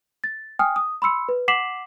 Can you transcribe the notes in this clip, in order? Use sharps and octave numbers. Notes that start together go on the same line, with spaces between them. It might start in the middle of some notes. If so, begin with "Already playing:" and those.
A6
G5 G#5 D#6 F6
D#6
B5 C6 E6 C#7
B4
F#5 D6 B6 C7 E7 F#7